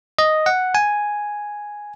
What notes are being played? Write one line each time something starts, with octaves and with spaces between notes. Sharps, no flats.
D#5
F#5
G#5